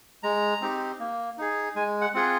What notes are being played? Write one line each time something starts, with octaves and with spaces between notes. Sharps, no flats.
G#3 A#5
C4 D#4 G4
A#3
D#4 G#4
G#3 G#5
F#5
C4 F4 G#4 F#5